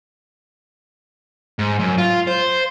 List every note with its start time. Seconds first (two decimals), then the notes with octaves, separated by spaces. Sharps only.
1.59 G#2
1.80 F#2
1.98 F4
2.27 C5